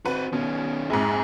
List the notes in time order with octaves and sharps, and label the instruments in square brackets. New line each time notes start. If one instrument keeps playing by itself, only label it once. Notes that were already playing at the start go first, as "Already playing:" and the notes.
[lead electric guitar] C4 F#4 [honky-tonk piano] B4
[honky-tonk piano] B2 [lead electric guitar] D#3 C#4
[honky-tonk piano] A#1 F2 G#2 [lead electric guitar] G#4